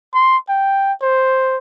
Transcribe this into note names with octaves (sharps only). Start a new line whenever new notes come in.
C6
G5
C5